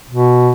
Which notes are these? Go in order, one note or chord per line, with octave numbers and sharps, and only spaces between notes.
B2